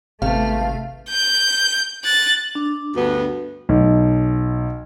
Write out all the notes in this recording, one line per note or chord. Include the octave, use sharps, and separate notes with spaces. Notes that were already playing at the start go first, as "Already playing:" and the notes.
G#1 C3 A3 B3 F5
G6
F#6 A6
D4
D2 G2 B3
B1